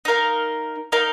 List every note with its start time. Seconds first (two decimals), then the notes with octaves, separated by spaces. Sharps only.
0.05 D#4 A#4 F5
0.92 D#4 A#4 F5